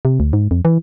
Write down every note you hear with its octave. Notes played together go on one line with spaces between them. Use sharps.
C3
D2
G#2
F2
E3